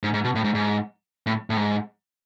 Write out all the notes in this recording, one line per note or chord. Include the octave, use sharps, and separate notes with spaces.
G#2
G#2
B2
A2
G#2
G#2
A2
A2
G#2